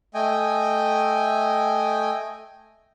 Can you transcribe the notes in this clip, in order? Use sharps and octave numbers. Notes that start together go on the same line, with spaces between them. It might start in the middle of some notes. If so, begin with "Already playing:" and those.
A3 D#5 G5 G#5